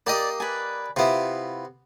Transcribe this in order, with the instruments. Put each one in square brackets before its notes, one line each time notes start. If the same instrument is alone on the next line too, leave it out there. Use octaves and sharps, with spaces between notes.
[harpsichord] A#3 G4 D#5 [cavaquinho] D5 D#6
[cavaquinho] B4 D5 G#5
[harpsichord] C3 B3 [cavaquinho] E4 F4